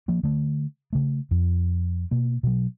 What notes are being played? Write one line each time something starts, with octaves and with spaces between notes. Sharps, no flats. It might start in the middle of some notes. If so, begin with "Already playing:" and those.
F3 A#3
D3 A3
C#3 A3
F2 F3
B2 A#3
B2 F#3